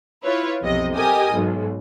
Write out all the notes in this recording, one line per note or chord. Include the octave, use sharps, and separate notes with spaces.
E4 F4 B4 C#5
B1 F2 C3 D#5
G4 A4 A#4 D#5 G#5 D#6
B1 G#2